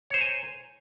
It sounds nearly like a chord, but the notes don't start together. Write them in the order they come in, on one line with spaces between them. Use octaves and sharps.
C#5 C5 A#5 G#5